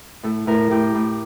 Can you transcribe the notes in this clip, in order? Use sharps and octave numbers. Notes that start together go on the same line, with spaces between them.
A2 A4
A2 A#4
A2 G4
A2